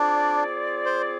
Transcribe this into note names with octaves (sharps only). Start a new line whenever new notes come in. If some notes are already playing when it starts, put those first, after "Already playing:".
Already playing: C4 D4 F4 G#4 D5
C5